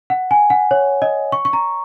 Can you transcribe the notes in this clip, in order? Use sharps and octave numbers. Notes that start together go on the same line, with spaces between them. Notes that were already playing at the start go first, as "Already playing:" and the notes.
F#5
G#5
F#5
C#5
D#5
C#6
C#6
A#5